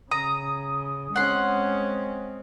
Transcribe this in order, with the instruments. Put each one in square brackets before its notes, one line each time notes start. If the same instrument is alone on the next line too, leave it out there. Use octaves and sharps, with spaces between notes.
[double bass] C#3 [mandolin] A#5 [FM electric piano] D#6
[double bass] G#3 C4 [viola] C#4 [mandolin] F#5 C6